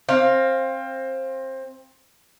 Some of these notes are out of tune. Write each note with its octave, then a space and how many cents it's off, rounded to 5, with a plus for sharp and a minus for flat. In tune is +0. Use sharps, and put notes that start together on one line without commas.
C4 +20 F5 +0